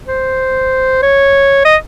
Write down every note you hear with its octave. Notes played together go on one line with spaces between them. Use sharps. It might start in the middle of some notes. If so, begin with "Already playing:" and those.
C5
C#5
D#5